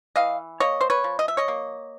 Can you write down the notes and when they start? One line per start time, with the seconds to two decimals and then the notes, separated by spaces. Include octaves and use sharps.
0.16 E3 D#5 F5
0.60 A#3 C#5 D#5
0.81 C5
0.90 B4 C#5
1.04 F3
1.19 D#5
1.28 E5
1.37 C#5 D#5
1.48 A#3